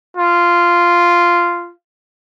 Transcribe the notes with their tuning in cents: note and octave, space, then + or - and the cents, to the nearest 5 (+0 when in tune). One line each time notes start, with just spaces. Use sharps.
F4 -10